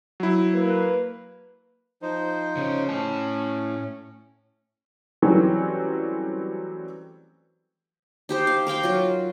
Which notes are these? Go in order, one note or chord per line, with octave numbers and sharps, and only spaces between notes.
F#3 E4
A#3 B4
F3 D#4 C5
C#3 C#4
A2 C#4 A5
E3 F#3 G3 A3 C4 C#4
D#4 G4 C5
F5
A#4 F5 G5 C6
F#3 F4